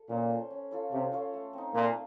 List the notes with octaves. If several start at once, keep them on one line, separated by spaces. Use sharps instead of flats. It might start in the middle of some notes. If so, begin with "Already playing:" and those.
Already playing: A4
A#2 C#4
A4 C5
C#4
F4 A4 C#5
C3 C#4
F4 A4 C#5
A3
C4 D#4
A#2 A3